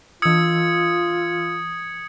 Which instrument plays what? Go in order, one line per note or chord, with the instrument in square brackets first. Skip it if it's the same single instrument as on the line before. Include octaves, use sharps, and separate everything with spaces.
[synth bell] E3 E6 [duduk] F4 [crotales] D#6 G#6 C#7